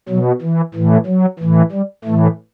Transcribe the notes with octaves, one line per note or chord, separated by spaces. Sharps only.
B2 F#3
E3
A2 E3
F#3
A2 E3
G3
A2 E3 A3